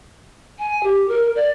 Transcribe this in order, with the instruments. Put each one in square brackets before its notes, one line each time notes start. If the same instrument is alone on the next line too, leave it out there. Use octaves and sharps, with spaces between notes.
[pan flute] G#5
G4
A#4
D5